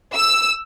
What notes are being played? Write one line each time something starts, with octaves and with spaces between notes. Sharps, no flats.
E6